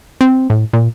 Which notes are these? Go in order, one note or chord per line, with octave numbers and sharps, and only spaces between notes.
C4
A2
A#2